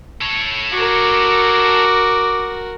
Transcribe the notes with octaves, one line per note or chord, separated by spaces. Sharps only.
A4 C#5
F#4 A#4 D6